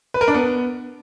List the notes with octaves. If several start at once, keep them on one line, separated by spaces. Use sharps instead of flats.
B4
A#4
D4
B3